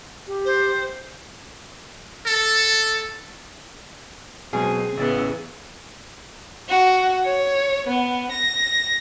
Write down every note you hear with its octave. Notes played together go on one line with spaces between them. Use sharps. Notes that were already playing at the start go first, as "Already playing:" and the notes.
G4
C5
A4
B2 F#3 G#3 C4 G#4
A1 C#3 B3 E4 A6
F#4
C#5
B3
A#6